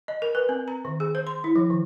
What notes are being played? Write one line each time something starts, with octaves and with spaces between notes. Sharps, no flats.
D#5
A#4
B4
C4
A#5
D#3
G#4
C5
C6
E4
F3
D#3